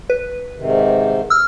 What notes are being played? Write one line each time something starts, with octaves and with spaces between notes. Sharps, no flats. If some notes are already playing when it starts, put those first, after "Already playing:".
B4
G#2 C3 D#3
C3 E6 F6